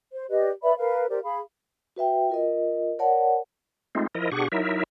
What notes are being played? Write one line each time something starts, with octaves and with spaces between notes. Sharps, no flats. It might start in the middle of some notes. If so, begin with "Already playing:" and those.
C5
G4 B4 D5 D#5
B4 D5 E5 B5
A#4 B4 F5
G4 A#4 C5 D5
G#4 F5 B5
F#4 B4 E5 G5
F4 A#4 D#5
A#4 C#5 D5 F#5 A5
G#3 A3 C4 D#4 F4
F3 E4 A#4 D#5
B2 D4 G4 G#4 F#5 C#6
F#3 D#4 E4 A#4 E5